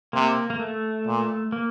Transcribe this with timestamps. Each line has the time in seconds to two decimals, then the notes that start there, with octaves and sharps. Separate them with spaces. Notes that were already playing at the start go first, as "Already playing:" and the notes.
0.13 C3 A#3
0.50 A#3
0.59 A3
1.06 A#2
1.52 A#3